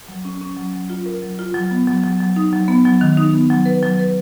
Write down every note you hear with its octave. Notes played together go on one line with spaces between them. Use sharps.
F#3
C#4
C#4
F#3
F#3
F4
A#4
F#3
F4
F#3
B3
F#3
F#3
F#3
D#4
F#3
B3
F#3
D#3
D#4
B3
F#3
B4
F#3
B4